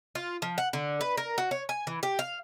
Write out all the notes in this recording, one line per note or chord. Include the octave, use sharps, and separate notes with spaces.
F4
F3
F#5
D3
B4
A#4
F#4
C#5
G#5
E3
G4
F5